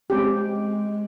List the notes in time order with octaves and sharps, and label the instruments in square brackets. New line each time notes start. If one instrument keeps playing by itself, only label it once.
[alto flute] G#3 [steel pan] C4 C#4 G4